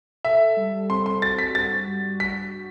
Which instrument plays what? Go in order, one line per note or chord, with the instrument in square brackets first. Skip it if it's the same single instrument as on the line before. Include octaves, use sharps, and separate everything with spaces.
[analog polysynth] A4 [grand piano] E5
[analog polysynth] G3
[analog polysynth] C4 [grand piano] C6
[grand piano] C6
[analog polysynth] F#4 [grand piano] A6
[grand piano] B6
[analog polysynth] G2 [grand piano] A6
[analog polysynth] G2
[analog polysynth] G2 [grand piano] B6